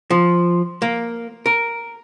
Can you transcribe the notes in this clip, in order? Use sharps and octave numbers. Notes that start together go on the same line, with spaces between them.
F3
A#3
A#4